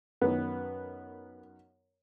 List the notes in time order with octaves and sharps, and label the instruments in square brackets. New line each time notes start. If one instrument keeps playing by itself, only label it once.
[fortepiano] F#2 D#3 B3